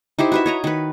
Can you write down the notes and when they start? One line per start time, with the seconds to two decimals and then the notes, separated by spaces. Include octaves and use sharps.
0.19 D#4 E4 G4 C5
0.32 F#4 B4 E5
0.46 C#5 D#5 A#5
0.64 D#3 B4